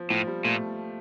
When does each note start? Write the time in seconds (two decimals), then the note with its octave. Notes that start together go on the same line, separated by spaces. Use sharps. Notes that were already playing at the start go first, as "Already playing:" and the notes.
Already playing: F3
0.10 A2 F3
0.27 G3
0.44 A#2 A3